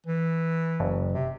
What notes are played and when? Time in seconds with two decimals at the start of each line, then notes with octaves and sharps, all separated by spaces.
0.07 E3
0.80 F#1
1.12 C3